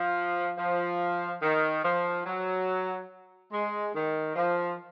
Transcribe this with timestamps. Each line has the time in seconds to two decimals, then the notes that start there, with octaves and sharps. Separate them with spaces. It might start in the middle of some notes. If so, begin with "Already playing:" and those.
Already playing: F3
0.58 F3
1.42 D#3
1.84 F3
2.26 F#3
3.52 G#3
3.95 D#3
4.36 F3